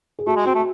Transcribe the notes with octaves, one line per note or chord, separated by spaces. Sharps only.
G#4
A3 F#4
G#3
C4 F#4
A3